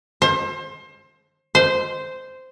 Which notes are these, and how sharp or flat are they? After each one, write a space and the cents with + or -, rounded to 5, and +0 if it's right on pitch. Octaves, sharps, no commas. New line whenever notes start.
C5 +30
C5 -10